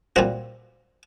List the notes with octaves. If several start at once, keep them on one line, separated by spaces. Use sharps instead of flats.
A#2 G3 C4 F#4